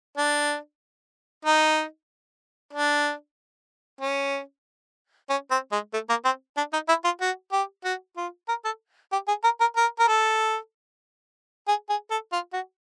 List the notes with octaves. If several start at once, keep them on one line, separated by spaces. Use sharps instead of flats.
D4
D#4
D4
C#4
C#4
C4
G#3
A3
A#3
C4
D4
D#4
E4
F4
F#4
G4
F#4
F4
A#4
A4
G4
G#4
A#4
A#4
A#4
A#4
A4
G#4
G#4
A4
F4
F#4